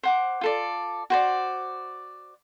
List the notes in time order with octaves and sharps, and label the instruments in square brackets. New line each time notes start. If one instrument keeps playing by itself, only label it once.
[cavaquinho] C5 F#5 D6
F4 A4 D5
F#4 C5 D5